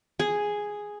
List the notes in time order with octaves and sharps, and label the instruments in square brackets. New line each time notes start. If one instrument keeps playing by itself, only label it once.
[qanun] G#4